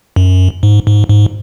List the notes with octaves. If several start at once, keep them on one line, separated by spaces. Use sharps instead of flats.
F#2
G#2
G#2
G#2